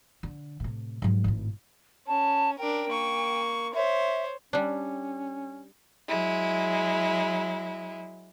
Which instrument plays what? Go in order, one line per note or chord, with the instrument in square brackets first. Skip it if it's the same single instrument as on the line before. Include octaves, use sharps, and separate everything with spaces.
[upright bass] D3
A2 C3
G#2 F#3
G#1 A2
[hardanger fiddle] C#4 [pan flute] A5
[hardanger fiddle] D4 A#4 [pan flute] G5
[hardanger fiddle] A#3 C#6
[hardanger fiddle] C5 C#5 [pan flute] E5
[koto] G3 D4 [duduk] C#4
[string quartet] F#3 G#3 E4